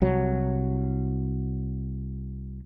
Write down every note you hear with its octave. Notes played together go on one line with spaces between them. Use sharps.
C2 F#3